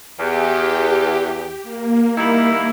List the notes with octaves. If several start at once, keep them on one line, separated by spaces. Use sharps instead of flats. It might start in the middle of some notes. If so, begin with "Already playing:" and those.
E2 G4
A#3
D#3 G3 E4